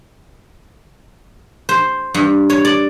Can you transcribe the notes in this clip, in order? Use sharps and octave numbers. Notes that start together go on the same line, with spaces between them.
C5
G2
C#5
D5